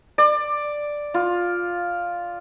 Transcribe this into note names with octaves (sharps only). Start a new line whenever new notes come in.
D5
F4